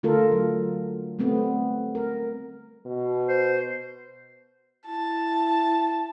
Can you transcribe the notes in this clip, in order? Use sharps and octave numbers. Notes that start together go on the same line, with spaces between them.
D3 A3 F4 A4 A#4
F#3
G3 A3 B3 C4
A#4
B2
C5
E4 A5